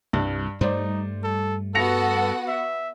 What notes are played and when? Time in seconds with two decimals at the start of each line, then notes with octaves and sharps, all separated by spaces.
0.13 C2 G2
0.61 G2 G3 A3 D#4 C5 D5
1.23 A4
1.75 B3 F#4 A4 F#5 A#6 C#7 F7
2.48 E5